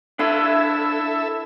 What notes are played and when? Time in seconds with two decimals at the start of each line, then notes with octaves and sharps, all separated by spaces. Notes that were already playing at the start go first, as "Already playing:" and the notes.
0.19 D4 E4 A4 E5 F5